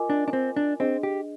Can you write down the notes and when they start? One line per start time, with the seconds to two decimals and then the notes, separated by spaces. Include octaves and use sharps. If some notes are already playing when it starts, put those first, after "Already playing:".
Already playing: F4 A#4 D#5 G#5 D6
0.10 D4
0.28 D4
0.33 C4
0.56 D4
0.80 C4 D4 G#4 D#5
1.03 G4